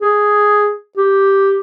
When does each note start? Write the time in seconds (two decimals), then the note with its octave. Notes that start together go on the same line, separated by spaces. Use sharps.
0.02 G#4
0.97 G4